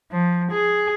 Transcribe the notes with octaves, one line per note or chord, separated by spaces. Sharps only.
F3
G#4